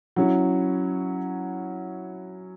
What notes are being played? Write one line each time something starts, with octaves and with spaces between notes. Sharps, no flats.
F#3 C#4 E4